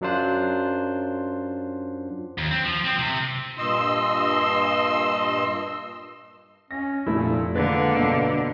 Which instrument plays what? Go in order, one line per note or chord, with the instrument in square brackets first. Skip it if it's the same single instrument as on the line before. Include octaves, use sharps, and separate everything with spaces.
[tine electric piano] F#2 F#3 D4 F4 C5 F#6
[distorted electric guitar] D#2
C4
F3
C4
C3
[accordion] G2 A#2 D#5 C6 E6
[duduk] C#4 [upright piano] A#6
[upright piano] F1 [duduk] A#2 [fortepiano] A3 E4
[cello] D3 [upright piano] G#3 [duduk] A#3 [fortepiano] B4
[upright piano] G1 B2 C7